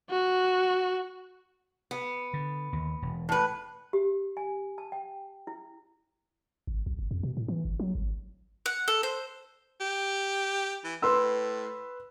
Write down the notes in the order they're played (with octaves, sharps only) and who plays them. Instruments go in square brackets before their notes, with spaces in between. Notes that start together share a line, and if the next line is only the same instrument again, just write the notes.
[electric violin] F#4
[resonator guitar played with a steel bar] B3
[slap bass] D3
D#2
E1
[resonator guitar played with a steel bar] A2 B4
[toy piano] G4
G#5
A5
G5
E4
[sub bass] G#1
B1
F#1
F2
B2
A2
E3
G1
F#3
G#1
[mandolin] F#5
A4
C5
[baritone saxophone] G4
E3
[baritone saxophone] A2 [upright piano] B4 C6 E6